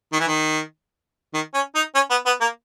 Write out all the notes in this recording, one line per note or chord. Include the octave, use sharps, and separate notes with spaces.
D#3
E3
D#3
D#3
C#4
D#4
C#4
B3
B3
A#3